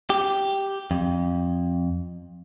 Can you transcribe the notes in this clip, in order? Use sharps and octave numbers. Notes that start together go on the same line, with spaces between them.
G4
F2